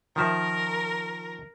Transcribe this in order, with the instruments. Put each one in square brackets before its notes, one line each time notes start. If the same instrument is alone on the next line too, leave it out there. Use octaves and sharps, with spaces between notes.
[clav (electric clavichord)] D#3 F3 E5 [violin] A#4